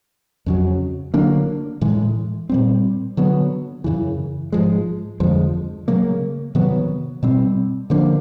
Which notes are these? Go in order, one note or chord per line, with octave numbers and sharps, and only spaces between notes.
F2 C#3 F#3
D3 F#3 A#3 D4
A2 E3 G#3
A#2 G3 C4
D3 F#3 B3
F#2 C#3 E3
G#2 F3 G#3
F2 D3 F3 G#3
C#3 F#3 A#3
C3 D#3 F#3 B3
B2 G3 C4
D3 F3 A#3 D4